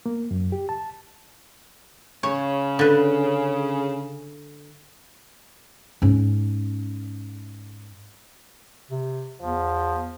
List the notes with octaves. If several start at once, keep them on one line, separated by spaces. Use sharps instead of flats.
A#3
F#2
G4
A5
C#3 C#5
D3 B4
G#2 C#4
C3
E2 F3